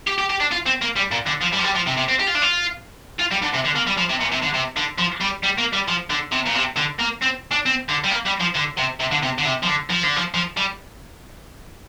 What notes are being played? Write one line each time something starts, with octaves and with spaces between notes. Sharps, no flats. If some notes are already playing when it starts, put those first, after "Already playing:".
G4
G4
G4
D4
F4
C4
A#3
G3
A#2
D3
F3
G3
F3
G3
F3
C3
C3
C4
G4
F4
D4
F4
F4
G3
D3
C3
D3
A#3
G3
F3
C3
A#2
C3
D3
C3
D3
F3
G3
G3
A#3
G3
F3
D3
C3
A#2
C3
D3
A#3
C4
D4
C4
D3
G3
A#3
G3
F3
D3
C3
C3
D3
C3
D3
C3
F3
D3
F3
D3
F3
F3
G3